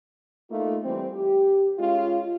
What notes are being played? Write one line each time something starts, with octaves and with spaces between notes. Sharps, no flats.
A3 A#3 D#4 F4
E3 G3 C4
G4
G#3 C#4 F4